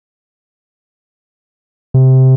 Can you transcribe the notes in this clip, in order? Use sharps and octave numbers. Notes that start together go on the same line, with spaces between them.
C3